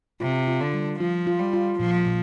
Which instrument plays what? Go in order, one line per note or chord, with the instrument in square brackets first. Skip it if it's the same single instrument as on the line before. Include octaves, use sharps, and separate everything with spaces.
[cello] C3 [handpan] F4
[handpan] F4
[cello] D3
[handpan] G3
[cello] F3 [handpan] F4
[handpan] F4
[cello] G3
[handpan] F4
[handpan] A#2 [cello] F3
[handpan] A#2